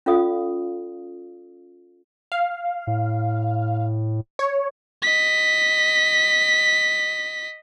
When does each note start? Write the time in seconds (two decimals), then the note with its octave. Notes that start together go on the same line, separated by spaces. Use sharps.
0.06 C#4 F4 A4 D5 F5 D#6
2.32 F5
2.87 A2
4.39 C#5
5.02 D#5 B6